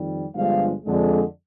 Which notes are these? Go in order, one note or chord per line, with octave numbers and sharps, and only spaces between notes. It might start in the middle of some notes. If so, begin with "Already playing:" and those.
Already playing: F2 D#3 G3
G1 G2 D3 F3 G#3 F5
F2 D3 G#3